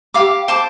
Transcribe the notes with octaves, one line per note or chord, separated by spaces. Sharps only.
G4 F5 D6
C5 A5 D6